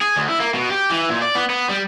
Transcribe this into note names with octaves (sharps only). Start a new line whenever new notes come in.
G#4
D2
E4
A#3
B2
G4
E3
A#2
D5
B3
B3
G3